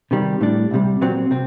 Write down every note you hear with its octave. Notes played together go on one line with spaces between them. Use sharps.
C3 D#3 G3
A2 G3 D4
C2 C3 G3
A#2 F#3 C4
C3 C4